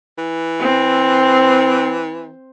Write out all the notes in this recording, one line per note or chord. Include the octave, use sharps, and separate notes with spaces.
E3
C4